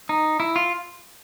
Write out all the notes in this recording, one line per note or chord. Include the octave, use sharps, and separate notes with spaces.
D#4
E4
F4